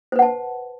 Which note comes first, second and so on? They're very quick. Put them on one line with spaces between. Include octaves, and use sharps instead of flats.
C5 B4 F#5 A5